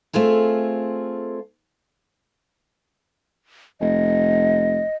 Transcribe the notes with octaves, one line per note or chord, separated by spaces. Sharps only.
A3 C4 F4 G#4 A4
F1 D#5